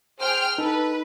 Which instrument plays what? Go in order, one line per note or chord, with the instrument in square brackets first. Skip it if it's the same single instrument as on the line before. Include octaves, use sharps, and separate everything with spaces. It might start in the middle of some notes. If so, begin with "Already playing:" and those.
[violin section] G#4 G5 F6 [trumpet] C5
[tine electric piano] D#4 [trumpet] A4 [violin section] B4